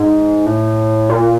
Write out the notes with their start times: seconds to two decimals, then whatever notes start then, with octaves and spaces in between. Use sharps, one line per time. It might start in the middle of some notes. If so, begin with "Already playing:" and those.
Already playing: G#2
0.46 A2
1.10 A#2